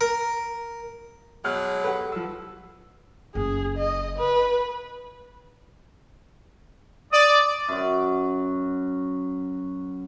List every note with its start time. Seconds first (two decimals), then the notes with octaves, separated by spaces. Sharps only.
0.01 A#4
1.44 B2 F#3 G#3 F#5 F6 F#6
1.84 G4 A4 B4 F#5
2.12 F3 F#5 E6
3.35 F#1 G#4
3.78 D#5
4.19 B4
7.12 D5 D#6
7.68 F#2 F#4